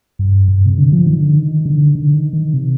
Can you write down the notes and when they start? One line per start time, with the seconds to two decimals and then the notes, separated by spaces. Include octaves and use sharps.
0.19 G2
0.48 G2
0.66 C3
0.78 D3
0.92 F3
1.07 D#3
1.21 D3
1.36 D#3
1.65 D3
1.95 D3
2.14 D#3
2.33 D#3
2.54 C3